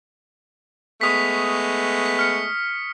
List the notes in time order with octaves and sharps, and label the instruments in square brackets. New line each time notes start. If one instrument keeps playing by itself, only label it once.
[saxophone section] G#3 A3 B3 [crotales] C#6 D#6 B6
[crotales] B6
F6 C#7